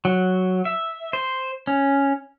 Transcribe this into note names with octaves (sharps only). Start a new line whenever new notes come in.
F#3
E5
C5
C#4